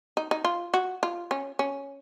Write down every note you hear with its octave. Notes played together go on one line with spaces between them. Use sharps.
D#4
D#4
F4
F#4
F4
C#4
C#4